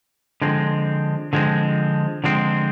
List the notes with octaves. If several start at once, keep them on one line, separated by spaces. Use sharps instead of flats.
D3 F3 G#3 C4
D3 F3 G#3 C4
D3 F3 G#3 C4